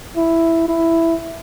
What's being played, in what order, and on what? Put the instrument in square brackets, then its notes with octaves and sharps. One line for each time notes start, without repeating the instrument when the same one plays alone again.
[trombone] E4
E4